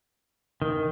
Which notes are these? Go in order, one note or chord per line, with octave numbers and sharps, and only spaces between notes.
D#3